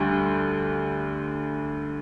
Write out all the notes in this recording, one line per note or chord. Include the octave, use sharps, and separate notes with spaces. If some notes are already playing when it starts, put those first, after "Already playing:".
Already playing: D2 D3 G3